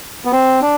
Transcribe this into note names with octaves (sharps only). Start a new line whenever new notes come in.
B3
C4
D4